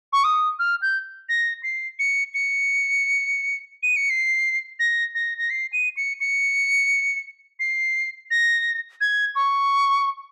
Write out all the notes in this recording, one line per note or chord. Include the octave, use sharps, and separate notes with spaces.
C#6
D#6
F6
G6
A#6
C7
C#7
C#7
D#7
C#7
C7
A#6
A#6
A#6
C7
D#7
C#7
C#7
C7
A#6
G#6
C#6